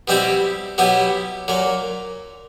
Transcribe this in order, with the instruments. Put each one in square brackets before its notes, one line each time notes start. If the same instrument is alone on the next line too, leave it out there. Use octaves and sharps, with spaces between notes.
[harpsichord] B2 G3 C4 E4 G4
B2 F#3 B3 E4 G4
A#2 F#3 A#3